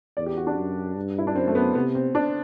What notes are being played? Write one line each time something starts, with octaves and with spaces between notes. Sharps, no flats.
E2 D5
G4
F#4
D4
F#2
G2
E4
D4
F#2 C4
A3
B3
C3 B3
C4
D4